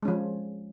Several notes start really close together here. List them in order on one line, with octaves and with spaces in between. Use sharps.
G#3 C#4 F3